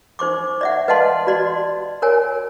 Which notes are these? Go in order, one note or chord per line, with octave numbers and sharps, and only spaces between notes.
D#4 C5 C#6 D6
D5 E5 F#5
B4 D#5 F5 F#5 A5 C6
F#4 D5 C6
A#4 C#5 G#5